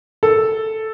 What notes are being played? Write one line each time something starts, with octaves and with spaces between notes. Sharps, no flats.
A4